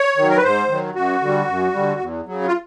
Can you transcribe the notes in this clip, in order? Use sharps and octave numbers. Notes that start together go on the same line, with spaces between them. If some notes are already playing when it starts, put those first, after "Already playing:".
Already playing: C#5
D#3 F#3
A#4
B4
G#2 C5
D#3 F#3
F#2 F#4
D3 G3
F#2
D3 G3
E2
C#3 F#3
F4